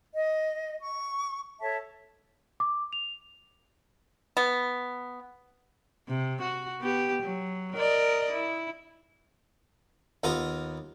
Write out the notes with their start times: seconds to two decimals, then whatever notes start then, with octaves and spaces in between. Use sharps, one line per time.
0.14 D#5
0.80 C#6
1.61 A4 C#5 E5 A5
2.60 D6
2.93 F7
4.37 B3
6.08 C3
6.42 F#4
6.81 B3 G4
7.22 F#3
7.75 A#4 D5 D#5
8.31 E4
10.24 D#2 B3 F4 A#4 D#6